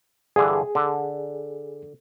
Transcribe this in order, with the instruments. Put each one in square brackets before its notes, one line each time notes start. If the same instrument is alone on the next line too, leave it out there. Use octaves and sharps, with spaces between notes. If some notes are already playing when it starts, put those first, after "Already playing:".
[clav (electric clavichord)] G2 D3 E3 [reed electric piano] G#4
[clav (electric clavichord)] D3